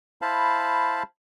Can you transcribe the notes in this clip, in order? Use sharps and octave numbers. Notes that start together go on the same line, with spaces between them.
E4 C5 F5 A5 B5